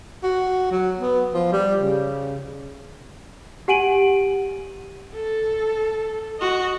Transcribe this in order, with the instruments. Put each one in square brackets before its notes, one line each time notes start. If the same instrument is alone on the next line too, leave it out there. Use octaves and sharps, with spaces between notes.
[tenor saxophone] F#4
F#3
B3
F3
G3
C#3
[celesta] G4 F#5 G#5 D7 D#7 F#7
[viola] A4
F#4 D#5